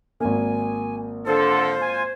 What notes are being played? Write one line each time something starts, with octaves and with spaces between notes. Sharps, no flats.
G#1 A#3 G#5
D3 F4 A4 C5
G#5